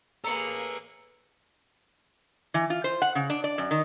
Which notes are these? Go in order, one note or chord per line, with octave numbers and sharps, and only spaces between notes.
A#3 G#4 A4 B4 A#5 E6 C#7 F#7
E3
F4
C5
F#5
C#3
D4
D5
F#2
D#3